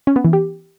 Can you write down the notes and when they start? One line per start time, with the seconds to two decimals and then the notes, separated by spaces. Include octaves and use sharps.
0.07 C#4
0.16 B3
0.24 E3
0.33 G4